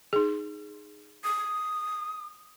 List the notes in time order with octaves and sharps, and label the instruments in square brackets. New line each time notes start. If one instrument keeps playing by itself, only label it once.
[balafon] D#4 G#4
[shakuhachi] D#6